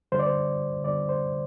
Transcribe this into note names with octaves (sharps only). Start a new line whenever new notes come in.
D2 D3 G3 C5
D5
C5
D2 D3 G3 D5
C5